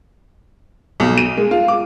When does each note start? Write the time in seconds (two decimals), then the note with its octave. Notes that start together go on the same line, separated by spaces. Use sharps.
1.00 B1
1.18 D#7
1.37 G#3
1.51 F4
1.68 D6